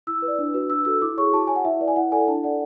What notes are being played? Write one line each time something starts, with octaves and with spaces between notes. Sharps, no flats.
E4 E6
B4
D5
D4
F#4 B4
D4 E6
F#4 A4 E6
E4 D6
G#4 C#5 C#6
F#4 A5
C#5 G#5
F#5
E4 E5
B4 D5
G#5
E4 F#5
A4 D5 G#5
D4 A5
A4 D5 F#5